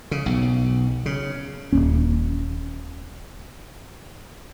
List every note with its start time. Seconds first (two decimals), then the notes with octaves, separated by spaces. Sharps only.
0.11 C#3
0.26 B1
1.06 C#3
1.72 D#1 G2 A#3 C#4